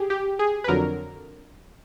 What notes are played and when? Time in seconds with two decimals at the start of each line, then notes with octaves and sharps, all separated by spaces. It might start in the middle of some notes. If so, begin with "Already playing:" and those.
Already playing: G4 G#4
0.10 G4
0.39 G#4
0.64 B4
0.68 F2 D3 F#3 A#4